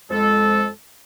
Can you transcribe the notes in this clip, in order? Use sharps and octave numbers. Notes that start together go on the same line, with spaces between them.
F2 G#3 A4